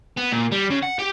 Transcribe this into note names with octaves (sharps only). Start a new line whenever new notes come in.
B3
A#2
G3
C#3
F#5
G4